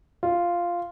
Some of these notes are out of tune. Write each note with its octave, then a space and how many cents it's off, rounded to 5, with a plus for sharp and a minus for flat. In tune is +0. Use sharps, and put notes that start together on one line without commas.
F4 -5